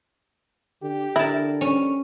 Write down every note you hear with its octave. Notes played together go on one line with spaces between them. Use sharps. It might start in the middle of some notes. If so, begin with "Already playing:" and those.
D3 G4
D3 E4 A#4 A5
G3 C#4